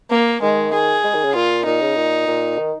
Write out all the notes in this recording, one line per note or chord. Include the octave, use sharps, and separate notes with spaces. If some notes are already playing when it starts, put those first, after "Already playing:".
A#3
D#3 G#3
G#4
G#3
D#3
C#3
A#2 F4
A#2 D#4
C#3
A#2
A#2
D#3